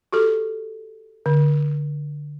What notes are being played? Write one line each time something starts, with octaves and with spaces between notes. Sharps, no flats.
F#4 G4 A4
D3